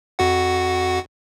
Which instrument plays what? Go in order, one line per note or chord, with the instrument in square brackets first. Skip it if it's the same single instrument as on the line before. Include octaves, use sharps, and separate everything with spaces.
[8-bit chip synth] F2 F#4 F#5